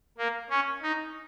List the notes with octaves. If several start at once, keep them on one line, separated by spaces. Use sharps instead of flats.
A#3
C#4
D#4